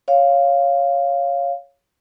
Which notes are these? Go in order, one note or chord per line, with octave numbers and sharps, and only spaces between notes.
C#5 F5